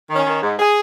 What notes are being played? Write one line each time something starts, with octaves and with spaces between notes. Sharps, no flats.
D#3
C#4
D#3
G#2
G#4